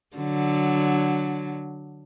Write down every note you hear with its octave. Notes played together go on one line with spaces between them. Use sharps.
D3 F#3